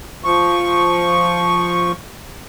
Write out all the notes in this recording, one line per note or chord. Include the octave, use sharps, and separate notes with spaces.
F3 C#6